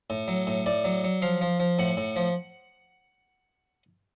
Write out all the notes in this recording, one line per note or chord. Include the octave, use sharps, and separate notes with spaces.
A2
F#3
A2
A2 D5
F#3
F#3
F3 F5
F3
F3
A2 F#5
A2
F3